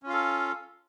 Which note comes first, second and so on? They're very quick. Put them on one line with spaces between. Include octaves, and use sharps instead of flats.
C#4 F4 F5 A4